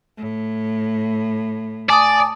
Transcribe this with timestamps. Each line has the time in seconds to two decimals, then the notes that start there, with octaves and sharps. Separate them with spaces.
0.18 A2
1.89 D5 G#5 A5 D6 D#6